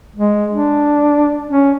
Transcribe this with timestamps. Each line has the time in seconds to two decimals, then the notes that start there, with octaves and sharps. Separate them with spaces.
0.16 G#3
0.52 D4
1.48 C#4